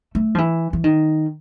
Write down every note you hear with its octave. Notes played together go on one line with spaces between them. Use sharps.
A3
F3
E3
E3
D#3